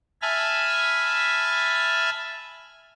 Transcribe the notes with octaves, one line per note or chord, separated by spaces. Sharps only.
E5 G#5 A5 B5 F6